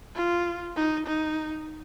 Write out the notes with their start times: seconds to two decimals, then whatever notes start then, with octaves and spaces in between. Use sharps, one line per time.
0.16 F4
0.76 D#4
1.07 D#4